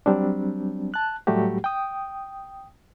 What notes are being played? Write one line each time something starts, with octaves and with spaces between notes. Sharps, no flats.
F#3 G3 C4 D4
A5 F#6
A2 F#3 G3 A3 F#4 G4
G5 D#6